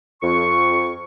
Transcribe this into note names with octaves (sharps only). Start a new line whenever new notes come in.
F2 C#6